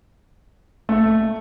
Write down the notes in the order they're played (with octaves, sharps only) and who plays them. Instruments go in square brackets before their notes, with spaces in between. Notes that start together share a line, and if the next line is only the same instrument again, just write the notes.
[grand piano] A3